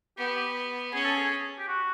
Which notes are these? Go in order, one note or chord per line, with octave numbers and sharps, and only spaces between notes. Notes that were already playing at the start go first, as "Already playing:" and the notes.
B3 G4
C#4 G#4
A4
G#4
G4
F#4